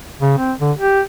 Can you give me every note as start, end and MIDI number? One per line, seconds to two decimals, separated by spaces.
0.21 0.33 49
0.38 0.53 60
0.60 0.72 50
0.77 1.01 67